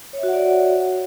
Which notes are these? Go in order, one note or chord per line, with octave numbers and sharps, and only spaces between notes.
F#4 C#5 D5 E5 F#5